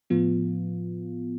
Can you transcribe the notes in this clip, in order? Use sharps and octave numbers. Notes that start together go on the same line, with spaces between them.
A2 F3 B3 F4